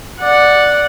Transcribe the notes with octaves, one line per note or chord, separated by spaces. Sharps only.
D5 F#5